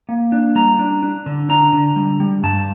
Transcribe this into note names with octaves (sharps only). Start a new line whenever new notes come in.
A#3
D4
G3 A#5
D4
D4
D3
D4 A#5
D3
G3
G3
G2 A5